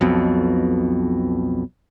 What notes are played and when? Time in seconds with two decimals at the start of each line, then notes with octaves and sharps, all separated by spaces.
0.01 B1 F2 B2